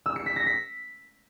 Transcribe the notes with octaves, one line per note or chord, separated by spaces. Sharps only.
E6
C#7
B6
A#6
B6